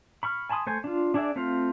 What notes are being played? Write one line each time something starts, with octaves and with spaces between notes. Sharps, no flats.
B5 C#6 F6
G#5 A5 B5 C6 D#6
A3 C5 G#5
D4 F4
D4 G#4 D5 E5
A3 C4 F4 C5 F5